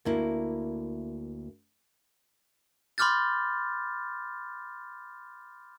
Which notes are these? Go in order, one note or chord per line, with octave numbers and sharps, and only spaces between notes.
D2 A#3 E4
B5 C6 D6 F6 G6 A6